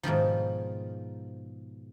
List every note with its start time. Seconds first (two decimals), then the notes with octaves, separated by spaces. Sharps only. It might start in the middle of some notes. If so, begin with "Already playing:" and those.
0.03 G#2 B2 D#3 F3